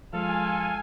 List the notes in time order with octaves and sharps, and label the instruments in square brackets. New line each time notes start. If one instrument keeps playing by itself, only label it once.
[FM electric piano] F3 G#3 [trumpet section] F4 A4 [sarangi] F5 [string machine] G#5